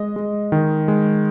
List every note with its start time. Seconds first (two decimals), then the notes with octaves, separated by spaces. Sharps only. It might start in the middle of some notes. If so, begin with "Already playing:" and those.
Already playing: G#3 D#5
0.16 G#3
0.52 D#3
0.88 G#3